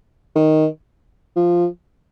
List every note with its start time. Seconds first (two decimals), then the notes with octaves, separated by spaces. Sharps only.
0.36 D#3
1.36 F3